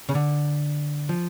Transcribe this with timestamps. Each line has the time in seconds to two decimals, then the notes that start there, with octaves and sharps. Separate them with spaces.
0.09 C#3
0.15 D3
1.09 F3